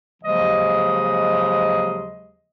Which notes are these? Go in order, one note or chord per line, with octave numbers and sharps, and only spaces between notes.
D#2 C#3 F3 F#3 G#3 D#5